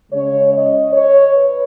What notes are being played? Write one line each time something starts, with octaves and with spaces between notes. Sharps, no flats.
C#3 G#3 C#4 C#5
D#5
C#5
B4